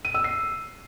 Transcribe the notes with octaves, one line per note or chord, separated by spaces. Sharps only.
D#7
E6
C7